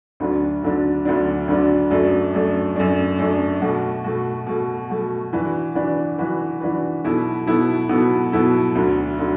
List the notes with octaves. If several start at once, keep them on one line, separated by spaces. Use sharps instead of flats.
D2 D3 F#3 D4
D2 D3 F#3 D4
D2 D3 F#3 D4
D2 D3 F#3 D4
F#2 F#3 A3 D4
F#2 F#3 A3 D4
F#2 F#3 A3 D4
F#2 F#3 A3 D4
B2 A3 F#4
B2 A3 F#4
B2 A3 F#4
B2 A3 F#4
E3 D4 F#4 B4
E3 D4 F#4 B4
E3 D4 F#4 B4
E3 D4 F#4 B4
B2 F#3 B3 E4 A4
B2 F#3 B3 E4 A4
B2 F#3 B3 E4 A4
B2 F#3 B3 E4 A4
D2 D3 F#3
D3 F#3